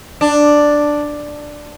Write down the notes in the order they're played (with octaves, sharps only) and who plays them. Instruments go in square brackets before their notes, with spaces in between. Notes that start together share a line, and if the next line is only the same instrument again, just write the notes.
[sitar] D4